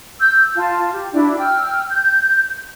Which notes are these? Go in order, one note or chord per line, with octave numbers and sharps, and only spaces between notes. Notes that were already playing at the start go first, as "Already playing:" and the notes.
E6 G6
F4 A5
G4
D4 E4 F#4
G5 E6 F6
G6